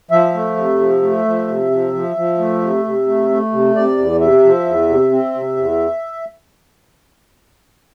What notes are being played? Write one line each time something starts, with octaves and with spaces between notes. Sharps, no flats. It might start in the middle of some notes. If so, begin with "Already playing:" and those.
F3 E5
A3
C3
F3
A3
F3
C3
F3
F3
F3
A3
C3
C3
A3
A3
C3
C3 D5
E2
C3 E5
F3
E2
C3
C4
C3
E2